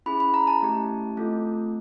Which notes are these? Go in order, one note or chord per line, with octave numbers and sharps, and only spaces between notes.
C#4 E4 G#4 B5
B5
A#5
A5
A3 C#4 E4 G4
A3 C4 F4 A4